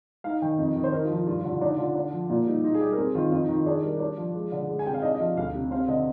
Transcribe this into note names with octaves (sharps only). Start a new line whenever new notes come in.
D#4 F5
D#3 G5
F2
D#3
C5
D#4 A#4
F4
F3
F4
G2 F4
F4
D3
F4
D4 D#4
D3 F4
D4
F3
A#2 F4
G3 D#4
D#4 F4
G#4
G3 G4
A#4
C4 G#4
D#3 F4
F2 F4
D#4
D#3
F4
D4 G#4
G3 A#4
D4 D5
F3
G#3
D3
G#3
G#5
C3 G5
F5
D4 D#5
D#5
F3 F5
D2 F5
C3
C4 F5
D3 D#5